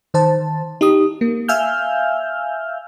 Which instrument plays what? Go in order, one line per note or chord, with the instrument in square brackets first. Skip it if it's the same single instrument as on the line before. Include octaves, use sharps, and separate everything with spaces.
[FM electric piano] D#3 C5 A5
D#4 G4 D#6
A#3
E5 F5 G#5 E6 F6 G6